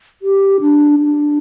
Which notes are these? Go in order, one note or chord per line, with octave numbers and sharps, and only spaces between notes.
G4
D4
D4